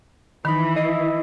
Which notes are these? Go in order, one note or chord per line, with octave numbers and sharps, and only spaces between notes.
D#3 E3 D#4 B5
E4 D#5 C7